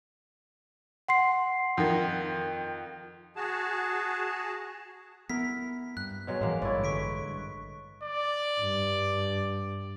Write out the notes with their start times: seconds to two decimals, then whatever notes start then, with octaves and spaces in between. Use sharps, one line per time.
1.08 F#5 C6 C7
1.78 F2 D#3
3.36 F#4 G#4 A5
5.30 B3 E4 A#4 B6
5.97 G2 F#6
6.27 B2 F#3 G#3
6.41 A2 E3 F3 G#3 A#3
6.62 A1 G2 E4 B4 C#5 D5
6.84 D3 C#6 B6 D7
8.03 D5
8.60 G2